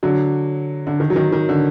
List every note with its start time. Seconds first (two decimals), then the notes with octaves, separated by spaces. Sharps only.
0.03 D3 F#3
0.87 D3
1.00 D#3
1.10 F#3
1.16 D#3
1.32 D#3
1.49 D3